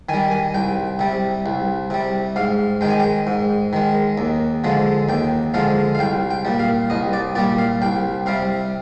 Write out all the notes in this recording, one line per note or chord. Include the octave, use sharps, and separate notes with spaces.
D#3 G3 G#5
G#5
C2 G5
C3 G3
C2
C3 G3
G#2 F5
D#3 G#3 G5
G#5
G5
G#2
D#3 G#3
D#2
D3 F3 G#3
D#2 G5
D3 F3 G#3 F5
F5
C2 G5
G5
A#2 G3
F5
C2 D#5
D5
A#2 G3 D5
F5
C2 G5
C3 G3 F5